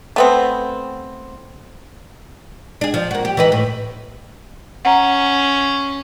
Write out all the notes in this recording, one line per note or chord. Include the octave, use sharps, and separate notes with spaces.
A3 B3 C4
D4 G#4
F3
A#3 F#4
G4
E3 D#4 B4
A2
C#4 F#5 A#5